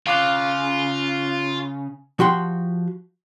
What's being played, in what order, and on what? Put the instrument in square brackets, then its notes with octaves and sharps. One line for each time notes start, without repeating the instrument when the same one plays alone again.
[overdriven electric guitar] C#3 [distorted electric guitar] F4 [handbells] F5 D6 F#6
[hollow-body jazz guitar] F3 F#4 G4 C6